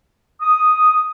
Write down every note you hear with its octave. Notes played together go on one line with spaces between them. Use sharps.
D#6